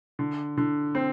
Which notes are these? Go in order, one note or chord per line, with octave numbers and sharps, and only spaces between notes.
D3
D3
C4